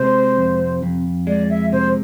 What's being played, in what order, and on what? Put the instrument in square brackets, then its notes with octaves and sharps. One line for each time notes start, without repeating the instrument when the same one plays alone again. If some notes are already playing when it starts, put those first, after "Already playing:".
Already playing: [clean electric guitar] C3 G#3 [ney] C5
[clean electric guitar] F2
F2
[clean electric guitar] G#3 [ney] D5
[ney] E5
[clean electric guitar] C3 [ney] C5